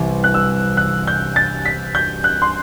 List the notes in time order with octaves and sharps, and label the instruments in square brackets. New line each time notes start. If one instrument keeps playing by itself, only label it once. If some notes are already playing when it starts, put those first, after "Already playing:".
Already playing: [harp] C2 C3 E3
[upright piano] F#6
E6
F#6
G6
A6
B6
G6
F#6
C6